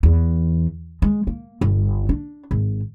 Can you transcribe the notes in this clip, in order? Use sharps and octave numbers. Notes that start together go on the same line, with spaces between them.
E2
G#3
A#3
G1
D4
G#1